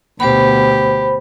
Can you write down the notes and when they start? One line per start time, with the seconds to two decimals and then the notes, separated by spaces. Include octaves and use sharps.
0.20 D2 B2 G4 C5 B5